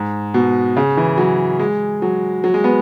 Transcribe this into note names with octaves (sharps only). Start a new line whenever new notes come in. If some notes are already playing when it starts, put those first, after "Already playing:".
Already playing: G#2
B2
C#3
E3
F#3
G#3
F#3
F#3
G#3
B3